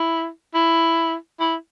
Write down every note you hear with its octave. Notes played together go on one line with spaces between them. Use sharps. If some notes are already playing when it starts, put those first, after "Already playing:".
Already playing: E4
E4
E4